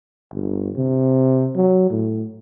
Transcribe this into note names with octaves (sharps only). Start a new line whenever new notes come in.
G1
C3
F#3
A2